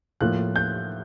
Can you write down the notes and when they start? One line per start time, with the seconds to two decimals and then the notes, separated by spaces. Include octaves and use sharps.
0.21 A2 F3 A#3 F#6
0.56 G6